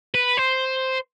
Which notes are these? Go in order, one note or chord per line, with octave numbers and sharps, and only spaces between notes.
B4
C5